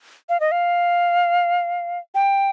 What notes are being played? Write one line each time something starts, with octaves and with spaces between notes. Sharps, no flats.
F5
D#5
F5
G5